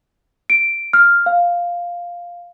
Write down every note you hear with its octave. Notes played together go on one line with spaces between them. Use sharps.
D7
F6
F5